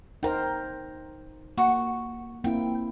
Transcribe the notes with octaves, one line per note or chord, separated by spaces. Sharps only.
D#4 A#4 C5 G5 A#5
A#3 F#4 C#6
A#3 C4 E4 G5